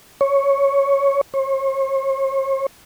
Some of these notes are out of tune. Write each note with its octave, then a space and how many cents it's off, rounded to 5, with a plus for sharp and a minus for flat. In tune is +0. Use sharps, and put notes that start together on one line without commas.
C#5 +0
C#5 -45